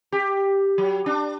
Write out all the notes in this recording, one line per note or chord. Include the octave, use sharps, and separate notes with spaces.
G4
F#3
D4